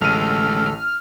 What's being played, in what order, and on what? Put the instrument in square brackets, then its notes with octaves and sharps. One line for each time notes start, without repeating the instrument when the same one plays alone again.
[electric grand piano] A1 D#7 [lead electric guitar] D2 G#3 [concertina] A4 [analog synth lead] F6